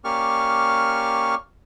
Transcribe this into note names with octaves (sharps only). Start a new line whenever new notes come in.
A#3 C#4 G4 D5 C#6 F6